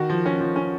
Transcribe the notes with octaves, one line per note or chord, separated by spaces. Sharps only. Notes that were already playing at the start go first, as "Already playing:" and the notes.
Already playing: D#3 F#4
F3
C#4
F3
C#4